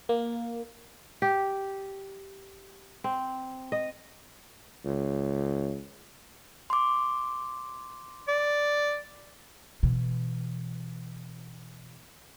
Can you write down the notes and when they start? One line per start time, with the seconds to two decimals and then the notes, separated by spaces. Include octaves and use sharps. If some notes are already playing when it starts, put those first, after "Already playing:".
0.09 A#3
1.22 G4
3.04 C4
3.72 D#5
4.85 C#2
6.70 C6 D6
8.28 D5
9.83 B2 E3